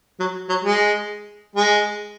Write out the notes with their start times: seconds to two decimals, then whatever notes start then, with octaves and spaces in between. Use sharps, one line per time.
0.20 F#3
0.49 F#3
0.65 G#3
1.56 G#3